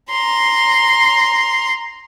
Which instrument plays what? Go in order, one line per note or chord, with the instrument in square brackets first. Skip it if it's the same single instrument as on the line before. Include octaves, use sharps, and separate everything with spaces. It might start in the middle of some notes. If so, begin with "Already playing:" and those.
[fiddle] A#5 C6